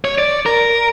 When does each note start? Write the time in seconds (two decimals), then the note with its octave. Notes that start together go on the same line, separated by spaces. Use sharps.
0.05 C#5
0.18 D5
0.46 A#4